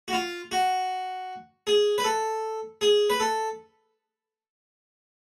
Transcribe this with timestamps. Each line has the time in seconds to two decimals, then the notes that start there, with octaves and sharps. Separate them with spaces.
0.08 F#4
0.13 F4
0.51 F#4
1.67 G#4
1.98 B4
2.04 A4
2.81 G#4
3.10 B4
3.20 A4